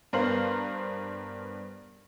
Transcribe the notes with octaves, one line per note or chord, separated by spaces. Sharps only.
G2 B3 A#4 C5 F5 F#7